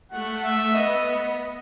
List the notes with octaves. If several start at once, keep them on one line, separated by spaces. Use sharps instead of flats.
A3 F#5
E5
B3 D#5
D#5